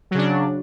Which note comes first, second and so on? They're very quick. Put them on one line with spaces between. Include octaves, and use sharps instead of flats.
F#3 C#3 D4